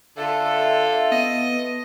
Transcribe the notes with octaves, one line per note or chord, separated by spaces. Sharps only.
D3 F4 A4 E5
B3 D#5